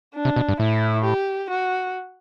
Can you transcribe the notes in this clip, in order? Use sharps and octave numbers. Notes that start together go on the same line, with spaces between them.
D4
C3
B2
G2
A2 E4
G4
F#4